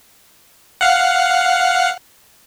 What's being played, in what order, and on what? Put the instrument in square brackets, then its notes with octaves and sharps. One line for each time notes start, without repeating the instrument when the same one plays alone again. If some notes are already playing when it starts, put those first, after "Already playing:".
[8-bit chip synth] F5 F#5